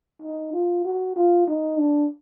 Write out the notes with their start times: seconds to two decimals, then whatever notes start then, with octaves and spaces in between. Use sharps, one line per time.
0.22 D#4
0.53 F4
0.85 F#4
1.16 F4
1.47 D#4
1.79 D4